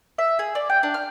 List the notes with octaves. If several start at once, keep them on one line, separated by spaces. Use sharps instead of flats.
E5
G#4
D5
G5
D4
F6